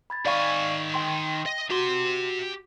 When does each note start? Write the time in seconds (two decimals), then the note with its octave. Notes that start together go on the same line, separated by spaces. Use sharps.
0.10 B5 G#6 A6
0.26 D#3 D5 F5 G#5 C#6
0.94 G5 C6
1.46 D#5
1.71 F#4 G4 C6